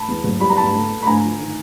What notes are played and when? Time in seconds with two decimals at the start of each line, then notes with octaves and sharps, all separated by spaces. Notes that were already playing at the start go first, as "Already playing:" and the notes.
Already playing: A5 B5
0.08 E2
0.24 F#1
0.40 G3 B5
0.49 A#5
0.57 B3 A5 B5
0.73 A3
0.89 A3
1.02 B5
1.06 D3 G#5 A#5
1.23 F3
1.39 D#3